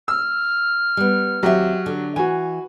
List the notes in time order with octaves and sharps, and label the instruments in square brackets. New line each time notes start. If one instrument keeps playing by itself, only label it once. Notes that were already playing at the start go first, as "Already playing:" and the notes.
[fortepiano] E6 [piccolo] F6
[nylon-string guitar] G3 B3
[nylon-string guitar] D#2 C4 E5 [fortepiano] F#3 G4
[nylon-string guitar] D3
[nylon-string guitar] E3 [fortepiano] F#4 G#5